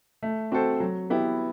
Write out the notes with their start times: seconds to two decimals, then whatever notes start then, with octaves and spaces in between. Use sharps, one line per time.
0.23 A3
0.52 C4 F#4 A4 C5
0.80 F#3
1.10 B3 E4 G4